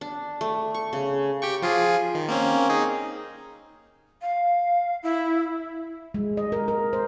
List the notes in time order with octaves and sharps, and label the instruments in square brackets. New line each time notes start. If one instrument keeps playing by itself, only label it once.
[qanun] D4
A3
C#6
C#3
[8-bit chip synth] G4 G5 C#6
F3 F4 G#4
D#3
A#3 C4 C#4
D#4 G#4
[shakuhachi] F5
E4
[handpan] G#3
D#5
A#4
A#4
C5